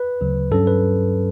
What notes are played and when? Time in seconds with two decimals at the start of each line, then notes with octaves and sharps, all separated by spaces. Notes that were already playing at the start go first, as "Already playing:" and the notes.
Already playing: B4
0.21 D2 C#3 F#3
0.51 G2 F#3 C#4 A4
0.67 B4